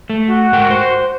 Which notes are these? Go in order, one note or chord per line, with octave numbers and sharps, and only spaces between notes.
A3
F#4
G#2 A#4 G5
C5